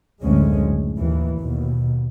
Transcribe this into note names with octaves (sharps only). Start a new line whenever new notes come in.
F#1 D2 A2 G#3 C#4
A2
D#2 E3
D#2 B2